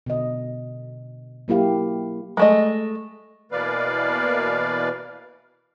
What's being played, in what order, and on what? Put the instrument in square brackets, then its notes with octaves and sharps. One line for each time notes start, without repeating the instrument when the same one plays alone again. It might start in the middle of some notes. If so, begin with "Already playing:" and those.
[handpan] B2 D3 D#5
F#3 A#3 E4 G4 F5
[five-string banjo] G#3 A3 D#5
[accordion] B2 E3 A#3 B4 D5 F5